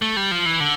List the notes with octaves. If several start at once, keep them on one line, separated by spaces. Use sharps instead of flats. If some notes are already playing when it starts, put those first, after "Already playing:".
A3
G3
F3
E3
D3